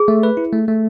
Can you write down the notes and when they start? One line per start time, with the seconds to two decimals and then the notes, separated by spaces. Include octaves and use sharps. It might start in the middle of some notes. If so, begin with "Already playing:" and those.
Already playing: G#4
0.08 A3
0.23 B4
0.37 E4
0.52 A3
0.68 A3